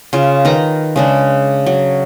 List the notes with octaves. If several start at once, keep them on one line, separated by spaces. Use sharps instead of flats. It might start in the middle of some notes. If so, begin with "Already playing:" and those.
C#3 F4
D#3 B4 A#5
C#3 G#3 D4
F#3